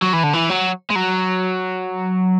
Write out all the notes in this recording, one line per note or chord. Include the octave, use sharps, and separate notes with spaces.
F#3
E3
D3
E3
F#3
G#3
F#3